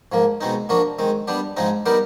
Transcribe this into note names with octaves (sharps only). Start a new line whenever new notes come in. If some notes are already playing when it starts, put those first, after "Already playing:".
G#2 F3 A#3
B2 G#3 C4 D#4
F3 A#3 D4 F#4
D#3 G#3 C4
G3 B3 D4 G4
G#2 F3 G#3 C4 D#4
G3 B3 D#4 G4 A#4